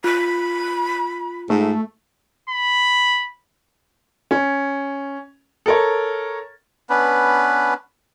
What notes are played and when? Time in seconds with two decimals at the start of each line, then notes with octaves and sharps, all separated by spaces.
0.04 F4 B5
1.50 G#2 A3
2.50 B5
4.31 C#4
5.66 A4 A#4 C#5
6.90 B3 C#4 D4 B4